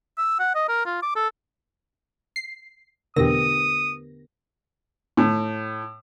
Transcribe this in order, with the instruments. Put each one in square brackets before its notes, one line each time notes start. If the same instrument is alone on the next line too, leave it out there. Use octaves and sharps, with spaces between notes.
[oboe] E6
F#5
D#5
A#4
F4
D6
A4
[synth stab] C7
[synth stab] E2 B2 A#6 [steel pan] D3 B3 G4 [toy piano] A#4 [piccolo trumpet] D#6
[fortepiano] A2